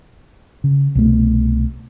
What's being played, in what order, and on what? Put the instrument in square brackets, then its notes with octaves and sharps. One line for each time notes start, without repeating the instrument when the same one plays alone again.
[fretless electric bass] C#3
C2 B2 A3